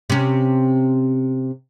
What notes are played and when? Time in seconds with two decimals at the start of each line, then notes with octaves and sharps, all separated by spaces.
0.10 C3 C#4